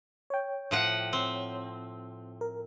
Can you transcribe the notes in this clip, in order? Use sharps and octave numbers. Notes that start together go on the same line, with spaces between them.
C#5 G5
A2 F3 F#5
C4
A#4